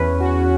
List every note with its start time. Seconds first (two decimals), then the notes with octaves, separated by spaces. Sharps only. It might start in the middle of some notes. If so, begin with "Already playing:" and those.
Already playing: E2 C#4 B4
0.20 F#4